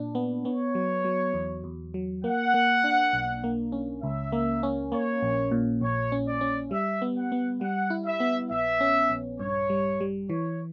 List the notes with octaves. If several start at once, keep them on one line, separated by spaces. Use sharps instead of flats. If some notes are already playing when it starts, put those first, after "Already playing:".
Already playing: A#2 D4
B3
B3 C#5
F#3
F#3
E2
E2
F#3
A#3 F#5
A#3
D4
B1
A#3
C#4
C#2 E5
A#3
C#4
A#3 C#5
A#1
A#2
A#1 C#5
C#4
D5
C#4
G3 E5
B3
F#5
B3
G3 F#5
E4
E5
B3
A#1 E5
C#4
A#1
G2 C#5
G3
G3
E3 C#5